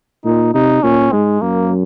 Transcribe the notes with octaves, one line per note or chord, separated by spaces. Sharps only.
A#2 D#4
C3 D#4
A#2 C#4
G#2 G#3
F#2 A#3